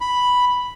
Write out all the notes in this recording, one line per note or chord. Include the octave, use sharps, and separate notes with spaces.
B5